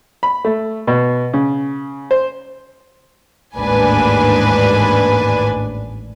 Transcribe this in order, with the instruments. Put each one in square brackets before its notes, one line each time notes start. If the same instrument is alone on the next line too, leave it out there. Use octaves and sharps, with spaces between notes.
[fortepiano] B5
A3
B2
C#3
C5
[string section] A1 D#2 G#2 D4 B4 G#5